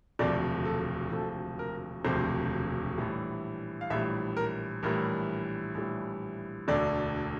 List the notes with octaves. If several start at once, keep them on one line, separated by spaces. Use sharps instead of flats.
E1 D2 C3 F3 D5
A4
E1 D2 C3 F3 A4
A#4
E1 D2 C3 F3 C5
A#1 A2 E3 G3
F5
A#1 A2 E3 G3 E5
A#4
A#1 A2 E3 G3 A#4
A#1 A2 E3 G3
E1 D2 D3 D5